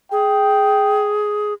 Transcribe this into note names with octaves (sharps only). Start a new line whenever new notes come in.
G#4 G5